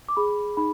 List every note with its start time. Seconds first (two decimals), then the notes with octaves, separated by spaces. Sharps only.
0.09 D6
0.17 G#4 B5
0.57 D#4 B5